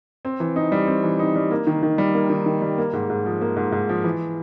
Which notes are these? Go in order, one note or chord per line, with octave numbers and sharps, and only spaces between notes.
C4
E3
D#4
G3
C4
E3
D#4
G3
A#3
D#3
D#3
G3
A#3
D#3
D#3
G3
A#3
G#2
G#2
F3
A#3
G#2
G#2
F3
E3